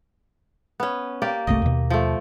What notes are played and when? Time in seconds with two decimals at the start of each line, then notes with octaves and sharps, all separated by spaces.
0.80 B3 C#4
1.22 A#3 G4 D5
1.47 G1 C2 A3 D#5
1.62 D#2 B2
1.90 F3 A3